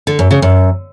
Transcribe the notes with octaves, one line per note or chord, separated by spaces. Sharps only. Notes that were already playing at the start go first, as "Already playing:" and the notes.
D3
F#2
C#3
F#2